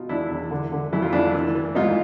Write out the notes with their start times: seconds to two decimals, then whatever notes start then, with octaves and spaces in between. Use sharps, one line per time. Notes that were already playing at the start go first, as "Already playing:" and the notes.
Already playing: B2 D#4 F4
0.09 E2 D4 E4
0.31 E2
0.51 D3
0.72 D3
0.93 F2 E4
1.02 F4
1.13 F2 D4 E4
1.35 E3
1.55 E3
1.75 G#2 D#4 F4